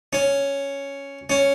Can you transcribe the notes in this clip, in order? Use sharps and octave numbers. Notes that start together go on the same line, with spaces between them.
C#4
C#4